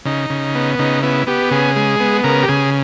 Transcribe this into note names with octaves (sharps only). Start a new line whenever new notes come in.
C#3 D#4
C#3
B3
C#3 D#4
B3 E4
B3 G4
C#3 G#4
G#3
B3
C#3 A#4
G4
C#3 G#4